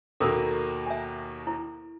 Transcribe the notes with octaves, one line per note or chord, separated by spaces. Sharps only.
D#2 B2 A#3 A4 A#4
E5 G#5
E4